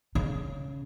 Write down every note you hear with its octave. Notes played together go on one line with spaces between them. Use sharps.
C#3